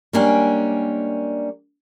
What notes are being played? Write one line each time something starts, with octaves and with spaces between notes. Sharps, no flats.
G3 G#3 A#3 C#4 D4 G5